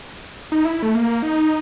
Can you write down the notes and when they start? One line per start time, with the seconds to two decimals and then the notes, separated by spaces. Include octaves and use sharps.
0.52 D#4
0.65 E4
0.83 A3
0.95 A#3
1.23 D#4